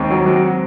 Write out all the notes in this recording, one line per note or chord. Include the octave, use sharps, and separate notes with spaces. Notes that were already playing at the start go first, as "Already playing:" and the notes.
Already playing: D#2 G#3 C4
F#3
F#4